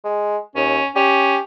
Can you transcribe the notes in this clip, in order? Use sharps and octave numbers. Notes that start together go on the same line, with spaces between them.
G#3
D#2 C#4
C#4 G4